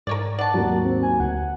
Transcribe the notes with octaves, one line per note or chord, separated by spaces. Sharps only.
G#2 A#4 C#5 D5
D5 F#5 A5
D#2 G#2 F#3
C4
G#5
D2 F#5